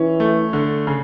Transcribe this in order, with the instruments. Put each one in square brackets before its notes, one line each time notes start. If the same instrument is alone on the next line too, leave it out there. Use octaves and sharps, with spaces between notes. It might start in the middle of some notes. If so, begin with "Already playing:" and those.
Already playing: [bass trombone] E3 [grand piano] C#4
[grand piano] A3
D3
C#3